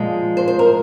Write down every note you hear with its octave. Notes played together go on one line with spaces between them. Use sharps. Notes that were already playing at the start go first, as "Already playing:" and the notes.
Already playing: A#2 F3 G#3
C5
C5
A#4